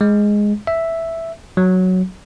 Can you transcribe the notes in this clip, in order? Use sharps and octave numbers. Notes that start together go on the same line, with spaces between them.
G#3
E5
F#3